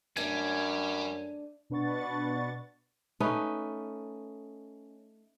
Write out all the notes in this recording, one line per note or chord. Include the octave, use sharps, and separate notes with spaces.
F#2 G3 A3 D4 G#5
B2 D4 B4 F#5 C#6 A6
A3 C#4 D#4 B4